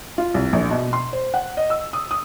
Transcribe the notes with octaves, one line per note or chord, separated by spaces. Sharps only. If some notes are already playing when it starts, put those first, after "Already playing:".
F4
C2
A#1
B2
C6
C5
F#5
D#5
E6
D#6
D#6